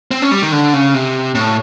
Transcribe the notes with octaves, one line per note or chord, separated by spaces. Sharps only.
C4
C#4
G3
D#3
D3
C#3
C3
A2